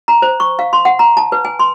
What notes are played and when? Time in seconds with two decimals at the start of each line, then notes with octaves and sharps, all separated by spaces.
0.08 A#5
0.22 C5
0.40 C#6
0.59 F5
0.73 C6
0.85 F#5
0.99 A#5
1.17 A5
1.32 B4
1.45 G#5
1.59 C6